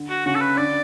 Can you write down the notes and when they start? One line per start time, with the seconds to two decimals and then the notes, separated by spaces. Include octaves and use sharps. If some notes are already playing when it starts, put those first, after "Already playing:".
Already playing: D3
0.10 F#4
0.26 C#3 F#4
0.35 A4
0.41 B4
0.57 D3 D5